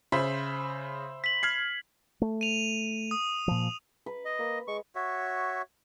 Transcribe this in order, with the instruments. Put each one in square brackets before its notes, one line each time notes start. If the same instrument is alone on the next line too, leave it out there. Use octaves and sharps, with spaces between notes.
[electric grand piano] C#3 [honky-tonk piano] C5 E5 B5
[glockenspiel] B6 F#7
[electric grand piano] F6 G#6 C7
[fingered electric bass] A3
[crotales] D#7 F7
D#6
[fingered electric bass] A#2 F3
[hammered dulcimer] B4
[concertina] D#5
[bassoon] A#3
[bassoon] G#3 [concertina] C#6
[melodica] F#4 C#5 E5